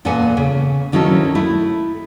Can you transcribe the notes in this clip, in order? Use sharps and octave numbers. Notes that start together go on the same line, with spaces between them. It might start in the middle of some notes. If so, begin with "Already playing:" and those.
E2 A#2 A4 B4 F#5 G#5
C#3
D2 D#3 F#3 C#4 E4 A4
A3 E4